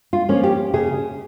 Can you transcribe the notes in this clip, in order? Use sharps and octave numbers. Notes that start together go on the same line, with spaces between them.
F4
F3 A#3 C#4
G4
C#3 G#4